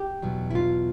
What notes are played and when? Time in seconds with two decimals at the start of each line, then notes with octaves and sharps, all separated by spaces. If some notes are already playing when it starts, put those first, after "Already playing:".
Already playing: G4
0.22 E2 B2 F#3
0.50 E4
0.55 F4